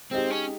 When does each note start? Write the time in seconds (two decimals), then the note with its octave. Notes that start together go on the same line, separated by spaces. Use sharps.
0.11 G#3 C4 D#4 G4
0.30 C#4